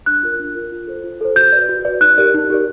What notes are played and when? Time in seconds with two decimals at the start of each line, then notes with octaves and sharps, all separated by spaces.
0.06 D4 F#6
0.23 F4 A#4
0.40 D4
0.55 F4 A#4
0.72 F4
0.87 A4 C5
1.04 F4
1.21 A4 C5
1.36 F#4 G6
1.52 B4 D5
1.69 F#4
1.85 B4 D5
2.01 D#4 F#6
2.18 G4 A#4 D5
2.34 D#4
2.50 G4 A#4 D5